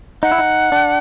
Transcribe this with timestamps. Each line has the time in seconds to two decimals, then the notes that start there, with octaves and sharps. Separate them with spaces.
0.23 D#4 F#5
0.32 E4
0.38 D#4
0.72 D4